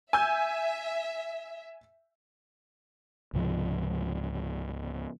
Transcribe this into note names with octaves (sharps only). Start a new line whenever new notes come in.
E5 G#5 E6 G6
C#2 G#2 C3 F3